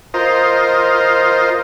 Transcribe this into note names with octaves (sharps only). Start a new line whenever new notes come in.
F4 A#4 C5 D#5